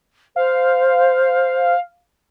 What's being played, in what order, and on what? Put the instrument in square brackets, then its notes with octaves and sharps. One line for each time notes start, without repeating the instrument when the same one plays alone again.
[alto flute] C5 [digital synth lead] F5